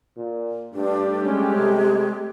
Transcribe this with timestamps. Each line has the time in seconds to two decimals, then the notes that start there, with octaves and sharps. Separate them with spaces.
0.17 A#2
0.74 G2 G3 A3 D4 G4
1.25 G#3 C#4
1.55 C3